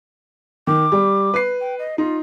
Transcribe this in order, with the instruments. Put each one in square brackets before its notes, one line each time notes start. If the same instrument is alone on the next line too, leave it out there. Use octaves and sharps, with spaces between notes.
[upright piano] D#3 [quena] D6
[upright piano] G3
B4 C7
[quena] G5
D#5
[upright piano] D#4 [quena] F4